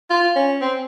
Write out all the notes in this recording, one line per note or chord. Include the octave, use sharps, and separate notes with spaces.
F4
C#4
C4